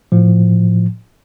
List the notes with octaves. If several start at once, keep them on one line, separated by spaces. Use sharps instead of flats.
A2 F3